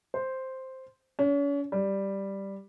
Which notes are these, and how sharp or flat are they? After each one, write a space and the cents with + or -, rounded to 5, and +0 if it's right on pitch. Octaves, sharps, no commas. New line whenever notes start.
C5 +0
C#4 +40
G3 +0